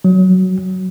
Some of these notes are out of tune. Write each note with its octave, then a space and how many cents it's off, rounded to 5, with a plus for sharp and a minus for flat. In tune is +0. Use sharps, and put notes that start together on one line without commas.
F#3 +5